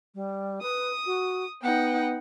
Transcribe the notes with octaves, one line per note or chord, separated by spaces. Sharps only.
G3
B4 D#6
F#4
B3 D#4 F#5 G5